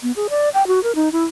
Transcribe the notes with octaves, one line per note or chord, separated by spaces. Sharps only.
B3
G#4
D5
G5
F#4
A#4
D#4
E4